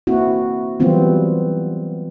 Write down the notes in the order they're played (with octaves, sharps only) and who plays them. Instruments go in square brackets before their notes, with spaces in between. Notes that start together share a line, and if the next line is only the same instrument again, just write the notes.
[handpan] A#3 C4 E4 F#4
E3 F#3 G3 B3 C4 F4